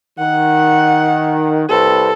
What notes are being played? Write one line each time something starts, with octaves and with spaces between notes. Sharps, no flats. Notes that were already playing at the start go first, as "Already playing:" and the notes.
D#3 F#5
C2 C4 A4 B4